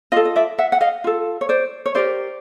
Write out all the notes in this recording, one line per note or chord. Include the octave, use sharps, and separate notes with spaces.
F4 A4 D#5 F5
D#5
D5 E5
E5 F#5
F#5
D#5 F5
F4 A4
C#5
C5 D5
C#5
E4 G4 A#4 C5 D5